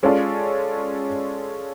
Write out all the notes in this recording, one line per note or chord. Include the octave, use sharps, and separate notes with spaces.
G#3 C#4 F4 A4 D5